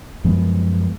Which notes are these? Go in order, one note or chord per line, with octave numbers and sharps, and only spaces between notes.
F#2 F3 G#3 B3